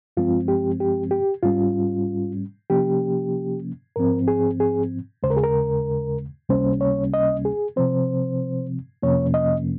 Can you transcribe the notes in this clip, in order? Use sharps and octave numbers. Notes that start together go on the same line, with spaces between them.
G2 F3 G#3 C4 F4
G4
G4
G4
G#2 G3 C#4 F4
C3 F3 A#3 C#4 G4
G#2 F3 C4 A#4
G#4
G#4
D#2 C#3 G#3 C5
A#4
G#4
A#4
C#2 C3 G3 A#3 C#4 C5
C#5
D#5
G#4
C3 F3 C4 C5
F2 C3 F3 A#3 C#4 C#5
D#5